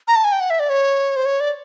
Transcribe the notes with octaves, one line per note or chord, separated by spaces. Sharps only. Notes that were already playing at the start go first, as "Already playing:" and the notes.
A#5
A5
G#5
G5
F#5
E5
D5
C#5
C5
C#5
D5